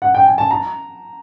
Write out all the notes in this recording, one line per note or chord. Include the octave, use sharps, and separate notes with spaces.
F#5
G5
G#5
A5
A#5